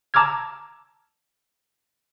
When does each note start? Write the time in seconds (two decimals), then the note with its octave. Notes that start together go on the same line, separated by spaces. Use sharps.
0.14 A5 A#5 D6 E6 F6 G#6